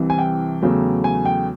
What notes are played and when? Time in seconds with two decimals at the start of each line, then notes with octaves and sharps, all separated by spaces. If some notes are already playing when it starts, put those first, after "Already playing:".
Already playing: C2 C3 E3
0.10 G#5
0.18 G5
0.62 E2 C#3 F#3 A3
1.04 G#5
1.25 G5